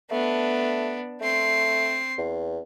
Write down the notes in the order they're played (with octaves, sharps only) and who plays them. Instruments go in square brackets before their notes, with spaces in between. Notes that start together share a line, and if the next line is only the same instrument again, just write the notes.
[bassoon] A3 [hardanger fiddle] B3 D4
[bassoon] A3 [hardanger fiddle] C4 C6
[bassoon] E2